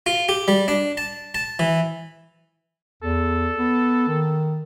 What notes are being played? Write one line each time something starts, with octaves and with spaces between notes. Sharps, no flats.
F4
G4
G3
D4
A5
A5
E3
E2 A4
B3
D#3